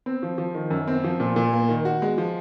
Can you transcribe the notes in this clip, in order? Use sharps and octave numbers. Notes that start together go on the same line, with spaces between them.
C4
F3
F3
D#3
F#2
C4
F3
A#2
A#2
A#3
D#3
F#4
G#3
F3